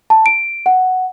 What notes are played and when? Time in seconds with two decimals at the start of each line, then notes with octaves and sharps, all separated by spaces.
0.10 A5
0.26 D7
0.66 F#5